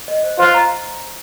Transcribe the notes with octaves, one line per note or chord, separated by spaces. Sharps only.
D#5
C5
F4 C5
A#5